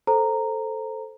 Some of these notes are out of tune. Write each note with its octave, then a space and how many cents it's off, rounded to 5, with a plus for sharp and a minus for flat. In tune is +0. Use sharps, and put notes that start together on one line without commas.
A4 +0 C5 +0 A#5 -10